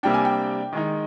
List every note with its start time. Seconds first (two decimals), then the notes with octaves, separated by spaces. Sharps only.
0.03 C3 G3 A#3 D4 G5
0.14 G#5
0.25 G5
0.73 D#3 G#3 D#4